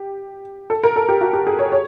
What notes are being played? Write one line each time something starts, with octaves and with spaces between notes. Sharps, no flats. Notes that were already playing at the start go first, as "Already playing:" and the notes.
Already playing: G4
A4
A#4
A4
G4
F#4
G4
G#4
C#5
C#5